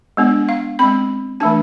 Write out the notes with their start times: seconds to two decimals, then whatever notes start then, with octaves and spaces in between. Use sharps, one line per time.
0.17 G#3 B3 D4
0.49 F5
0.79 G#3 C4 B5
1.40 E3 A3 D4 A5